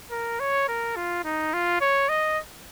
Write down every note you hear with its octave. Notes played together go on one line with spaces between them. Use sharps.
A#4
C#5
A#4
F4
D#4
F4
C#5
D#5